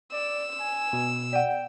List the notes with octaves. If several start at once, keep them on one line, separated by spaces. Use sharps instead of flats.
D5 E6
G#5
B2
D5 F#5 G5